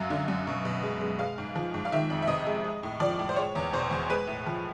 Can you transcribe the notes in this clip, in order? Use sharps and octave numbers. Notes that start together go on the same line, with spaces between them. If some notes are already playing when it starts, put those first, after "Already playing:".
Already playing: F#2 F#3 F5
D3
F#2
B2
B2
G#3
G#3
G#3 F5
G#2
F3
G#2
F5
D#3 E5
F2
E5
C3 D#5
G#3
G#3
A2
F3 D5
A2
C5
G#3 C#5
E2
B2 C5
E2
G#3 B4
A2
F3